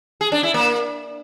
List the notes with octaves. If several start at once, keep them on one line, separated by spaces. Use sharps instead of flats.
G#4
D4
E4
A#3